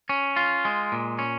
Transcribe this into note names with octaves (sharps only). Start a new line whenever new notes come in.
C#4
F4
G#3
A#2
C#4